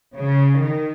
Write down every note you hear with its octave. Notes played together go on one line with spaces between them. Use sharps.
C#3
D#3